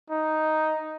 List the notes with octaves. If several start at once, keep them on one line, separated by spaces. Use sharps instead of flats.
D#4